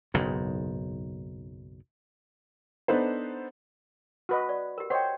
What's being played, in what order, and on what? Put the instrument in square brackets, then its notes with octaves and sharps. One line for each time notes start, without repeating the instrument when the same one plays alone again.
[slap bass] F#1 B1 G#2
[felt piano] B3 D4 D#4 A4 B4 C5
[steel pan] F#4 B4 D#5
[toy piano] D5
G4 A#4
[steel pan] C5 C#5 D#5 [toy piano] F#5 G5